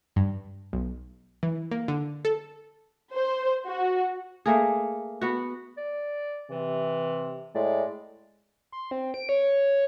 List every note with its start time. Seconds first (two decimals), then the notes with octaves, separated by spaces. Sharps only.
0.16 G2
0.73 B1
1.43 E3
1.71 A#3
1.88 D3
2.25 A4
3.13 C5
3.67 F#4
4.46 A3 A#3 G#4
5.21 B3 F#4
5.77 D5
6.51 C3 E3
7.55 A2 G#3 D5
8.72 C6
8.91 C4
9.14 D7
9.29 C#5